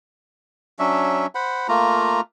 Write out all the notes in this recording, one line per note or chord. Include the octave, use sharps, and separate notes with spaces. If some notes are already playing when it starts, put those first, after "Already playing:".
F#3 C#4 D4 E5
C5 F#5 B5
A3 A#3 F4 A#5